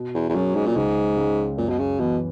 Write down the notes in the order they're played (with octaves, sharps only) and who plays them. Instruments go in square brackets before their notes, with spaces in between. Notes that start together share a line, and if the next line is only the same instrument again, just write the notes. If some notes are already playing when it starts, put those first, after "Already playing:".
Already playing: [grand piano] B2
[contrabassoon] E2
E2
[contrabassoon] F#2 [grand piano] F#3 C#4 G#4
[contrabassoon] G#2
A#2
[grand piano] C#2 [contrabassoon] G#2
[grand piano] C#3 G#3
[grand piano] F#2 [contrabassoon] A#2
[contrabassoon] B2
C#3
[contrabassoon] B2 [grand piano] E3 B3